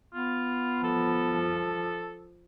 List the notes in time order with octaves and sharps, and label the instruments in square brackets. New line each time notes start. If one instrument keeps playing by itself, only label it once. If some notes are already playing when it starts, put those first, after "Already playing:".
[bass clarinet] B3 [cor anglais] F4
[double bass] F3 [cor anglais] A4